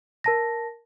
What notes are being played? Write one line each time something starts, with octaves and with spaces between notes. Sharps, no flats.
A#4 A5 A#6